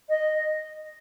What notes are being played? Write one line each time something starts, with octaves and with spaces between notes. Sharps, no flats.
D#5